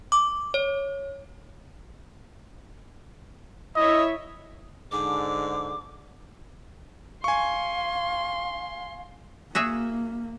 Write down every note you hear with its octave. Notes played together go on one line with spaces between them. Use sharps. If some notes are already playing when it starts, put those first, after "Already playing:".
D6
C#5
E4 C#5 D#5 E5
G#2 D3 D6
F5 G#5 C6 C#6
A#3 F#4 G#4 E5